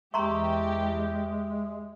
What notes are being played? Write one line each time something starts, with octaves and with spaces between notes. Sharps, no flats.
E2 G#3 G4 E5 A#5 C6 C#6